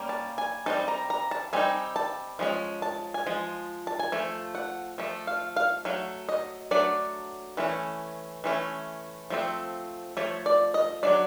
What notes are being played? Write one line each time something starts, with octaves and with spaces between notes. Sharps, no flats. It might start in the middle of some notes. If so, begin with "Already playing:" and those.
Already playing: G3 A#3 C#4
A5
G#5
G3 C4 D#4 A5
A#5
A#5
A5
G3 C4 D#4 G#5
A5
F3 G#3 C#4
A5
G#5
F3 G#3
A5
G#5
F3 A3
F#5
F3 A3
F5
F5
F#3 A3
D#5
F#3 A3 D4 D5
E3 A3 C#4
E3 A3 C#4
F3 A3 C4
F3 A3 C#5
D5
D#5
F#3 A3 D4 D5